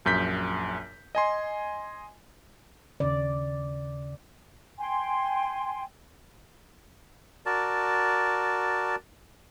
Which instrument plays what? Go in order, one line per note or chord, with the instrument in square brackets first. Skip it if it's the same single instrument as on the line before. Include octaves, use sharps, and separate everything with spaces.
[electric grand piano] A#1 F#2 G6 B6
D#5 G#5 C6
[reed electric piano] D#2 C#3 [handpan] D5
[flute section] G5 G#5 C6
[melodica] F#4 A#4 D5 A5